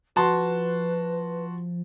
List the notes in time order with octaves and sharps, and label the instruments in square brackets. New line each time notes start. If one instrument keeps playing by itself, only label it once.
[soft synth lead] F3 [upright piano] F#4 A5 C6 [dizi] B4